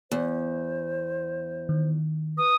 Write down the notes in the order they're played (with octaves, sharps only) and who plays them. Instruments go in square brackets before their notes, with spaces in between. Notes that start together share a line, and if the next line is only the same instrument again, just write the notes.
[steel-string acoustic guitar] E2 [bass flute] C5
[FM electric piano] D#3
[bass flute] B4 [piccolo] D#6